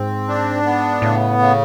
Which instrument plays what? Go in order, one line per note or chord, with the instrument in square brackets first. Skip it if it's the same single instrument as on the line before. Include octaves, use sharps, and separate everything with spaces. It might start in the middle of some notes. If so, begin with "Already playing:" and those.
Already playing: [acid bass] G#2 [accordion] C4
[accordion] D4
B3
[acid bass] A2 [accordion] C#3
[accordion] C#3